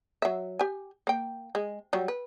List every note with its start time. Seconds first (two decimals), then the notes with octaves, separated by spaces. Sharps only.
0.22 F#3 E5
0.59 G4 G#5
1.07 A#3 G5
1.55 G#3
1.93 F#3 G3
2.08 B4